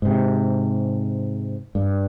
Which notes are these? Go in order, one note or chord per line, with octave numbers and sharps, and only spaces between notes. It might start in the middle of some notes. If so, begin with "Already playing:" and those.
G#2 C3
G2